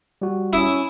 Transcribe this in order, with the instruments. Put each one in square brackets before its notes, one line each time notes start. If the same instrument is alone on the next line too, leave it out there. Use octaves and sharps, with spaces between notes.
[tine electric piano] G3 F#4
[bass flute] C#4 [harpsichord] E4 D#6